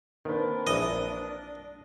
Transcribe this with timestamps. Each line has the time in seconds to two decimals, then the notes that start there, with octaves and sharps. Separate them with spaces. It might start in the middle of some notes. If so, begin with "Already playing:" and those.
0.25 D#3 A#3 C4 D4 B4
0.67 A#1 E3 D#5